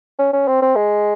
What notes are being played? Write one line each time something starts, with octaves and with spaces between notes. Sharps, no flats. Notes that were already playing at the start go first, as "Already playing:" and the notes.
C#4
C#4
C4
C4
G#3